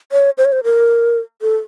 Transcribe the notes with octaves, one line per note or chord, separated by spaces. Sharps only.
C#5
C5
C#5
C5
A#4
A4